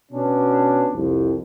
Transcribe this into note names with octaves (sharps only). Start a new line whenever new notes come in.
B2 B3 C#4 D4
C2 F2